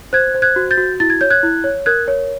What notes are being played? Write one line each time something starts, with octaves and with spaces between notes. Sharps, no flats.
C5 F#6 G#6
C5
F#6 G#6
F#4
G6 A6
F#4
E4 A6
G#6
C#5 G6
F#6 G#6
E4
C#5
A#4 F#6 G#6
C#5